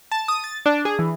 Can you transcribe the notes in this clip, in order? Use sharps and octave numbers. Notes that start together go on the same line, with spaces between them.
A5
D#6
A6
D4
G#4
E3